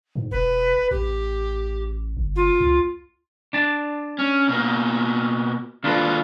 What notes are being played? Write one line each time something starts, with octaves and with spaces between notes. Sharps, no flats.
G#2
E1 B4
A1 G4
G1
F4
C#2
D4 A5
C#4
B2 A#3
D#2 D4 F4 A4 B4